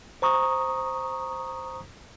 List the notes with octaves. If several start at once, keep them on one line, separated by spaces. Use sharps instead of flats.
C5 A#5 C#6 D#6